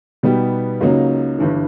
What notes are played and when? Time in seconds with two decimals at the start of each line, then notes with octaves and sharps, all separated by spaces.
0.23 B2 G3 B3 D#4 G4
0.81 C#2 C#3 F#3 A#3 D#4
1.39 G1 G2 E3